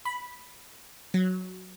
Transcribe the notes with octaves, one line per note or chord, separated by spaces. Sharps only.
B5
F#3